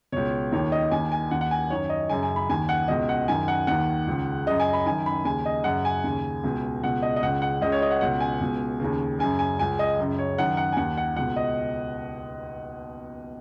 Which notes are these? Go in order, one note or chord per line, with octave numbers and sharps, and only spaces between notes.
C#2 B2 C#5
D#2 D#3 C#5
D#5
D#2 D#3 G#5
G#5
D#2 D#3 F#5
F#5
G#5
F#2 D#3 C#5
D#5
F#2 C#3 G#5
G#5
B5
D#2 D#3 G#5
F#5
C#2 B2 D#5
F#5
F#2 D#3 G#5
F#5
D#2 D#3 F#5
C#2 C#3
F#2 C#3 D#5
G#5
B5
F#2 D#3 G#5
B5
D#2 C#3 G#5
D#5
F#2 C#3 F#5
G#5
D#2 C#3
C#2 B2
C#2 B2 F#5
D#5
D#5
C#2 C#3 F#5
F#5
C#2 C#3 D#5
C#5
D#5
F#5
C#2 B2 F#5
G#5
C#2 B2
D#2 C#3
F#2 C#3 G#5
G#5
C#2 C#3 G#5
D#5
F#2 C#3
C#5
F#2 D#3 F#5
F#5
G#5
D#2 D#3 F#5
F#5
C#2 B2 F#5
D#5